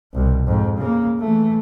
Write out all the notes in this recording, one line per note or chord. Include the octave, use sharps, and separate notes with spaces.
C2 B2
F2 G#2
C#3 A#3
E3 A3